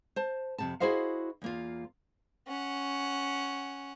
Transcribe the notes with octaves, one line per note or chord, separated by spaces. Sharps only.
C5 A5
F2 C3 A5
E4 F#4 G#4 C5 D#5 F5
E2 A#3 F4
C#4 F#5